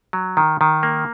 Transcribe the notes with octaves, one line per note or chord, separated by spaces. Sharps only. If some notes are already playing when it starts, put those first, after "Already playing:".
F#3
D#3
D#3
A#3